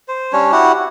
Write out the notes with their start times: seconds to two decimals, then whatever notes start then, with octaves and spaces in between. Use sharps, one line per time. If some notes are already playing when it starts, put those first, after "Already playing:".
0.08 C5
0.33 G3 C#4 D4 C#5
0.52 E4 F#4 G4 F#5
0.75 F#5